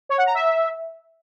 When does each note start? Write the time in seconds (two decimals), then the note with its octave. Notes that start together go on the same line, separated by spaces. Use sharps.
0.09 C#5
0.18 F#5
0.26 A#5
0.34 E5